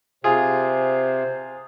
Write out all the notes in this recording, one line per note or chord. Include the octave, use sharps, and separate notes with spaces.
C3 F4 G#4 C5